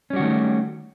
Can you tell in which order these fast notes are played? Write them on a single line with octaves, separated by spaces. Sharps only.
C#4 G3 F#4 D#3 A3